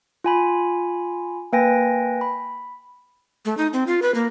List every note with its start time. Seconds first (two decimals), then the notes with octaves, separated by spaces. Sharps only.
0.24 F4 G#5 B5
1.53 A#3 B4 G5 G#5 A#6
2.21 B5
3.45 A3
3.57 D#4
3.73 C4
3.87 F4
4.02 B4
4.15 A#3